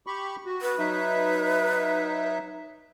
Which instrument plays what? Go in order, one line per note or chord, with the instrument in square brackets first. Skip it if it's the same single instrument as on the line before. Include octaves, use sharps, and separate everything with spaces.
[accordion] G4 B5 C#6
F#4
[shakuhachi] B4
[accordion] F#3 D#4 E5